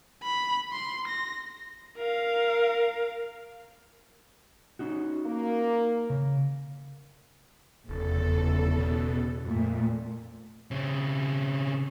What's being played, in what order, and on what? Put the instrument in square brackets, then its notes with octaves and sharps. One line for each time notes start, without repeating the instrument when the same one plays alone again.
[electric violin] B5
C6
A#6
A#4 F5
[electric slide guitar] C#4 D#4 F#4
[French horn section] A#3
[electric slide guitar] C#3
[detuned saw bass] F1 [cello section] E2 C#3 A4
[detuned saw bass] B2
[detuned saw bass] F2 [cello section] A#2 A3
[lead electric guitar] C#3 C4